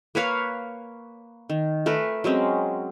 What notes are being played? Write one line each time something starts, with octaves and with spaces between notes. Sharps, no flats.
A#3 B4 C#5 F5
D#3
A3 A#4 B4 G#5
F#3 G#3 C4 C#4